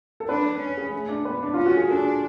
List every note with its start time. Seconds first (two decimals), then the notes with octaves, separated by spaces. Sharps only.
0.20 A4
0.29 D4 B4
0.60 C#4
0.77 G#4
0.93 A3
1.09 D4
1.25 B3 B4
1.43 D4
1.54 C#4 F4
1.66 F#4
1.77 G#4
1.89 D4 A4